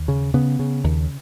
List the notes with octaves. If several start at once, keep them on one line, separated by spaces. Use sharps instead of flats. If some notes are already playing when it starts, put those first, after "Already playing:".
Already playing: D#2
C#3
C#3 B3
C#3
D#2